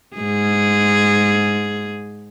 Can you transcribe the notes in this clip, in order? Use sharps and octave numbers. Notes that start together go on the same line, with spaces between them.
G#2 G#4